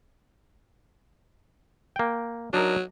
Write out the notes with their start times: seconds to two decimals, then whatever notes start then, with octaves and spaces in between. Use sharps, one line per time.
1.96 A#3 G5
2.53 F#3 D4 D#4 A#4